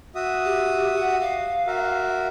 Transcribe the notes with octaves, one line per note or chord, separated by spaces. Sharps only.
F#4 E5 D#6
G4
F#5
F5
F#4 A#4 E5